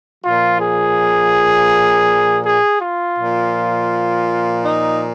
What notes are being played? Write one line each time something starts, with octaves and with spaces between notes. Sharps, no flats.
A#2 F3 F4
G#4
G#4
F4
A#2 F3
D#4